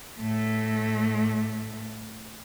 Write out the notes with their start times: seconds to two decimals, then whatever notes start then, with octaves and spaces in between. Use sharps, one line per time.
0.20 A2 A3